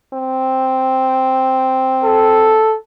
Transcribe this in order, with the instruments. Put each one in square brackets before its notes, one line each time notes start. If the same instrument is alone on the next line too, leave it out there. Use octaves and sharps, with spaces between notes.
[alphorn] C4
[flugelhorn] A4